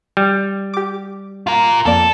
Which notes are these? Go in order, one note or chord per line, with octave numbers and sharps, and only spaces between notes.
G3
G4 D6
F4 A#4
F2 A#3 A4 D5